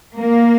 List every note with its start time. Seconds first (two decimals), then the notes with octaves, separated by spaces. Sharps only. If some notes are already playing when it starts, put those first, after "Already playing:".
0.18 A#3